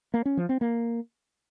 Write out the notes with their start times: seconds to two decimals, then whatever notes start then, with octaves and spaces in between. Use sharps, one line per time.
0.14 A#3
0.25 C#4
0.37 F3
0.49 C4
0.61 A#3